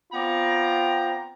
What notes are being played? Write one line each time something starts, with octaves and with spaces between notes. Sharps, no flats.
B3 C4 F4 D5 G5 A#5